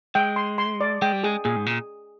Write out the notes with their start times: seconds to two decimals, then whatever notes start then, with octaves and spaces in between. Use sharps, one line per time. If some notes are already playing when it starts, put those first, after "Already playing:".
0.15 G#3 G5
0.36 C6
0.58 C6
0.81 D5
1.02 G#3 G5
1.13 G3
1.24 G#3 G#4
1.45 A#2 G#4
1.56 G#2
1.66 A#2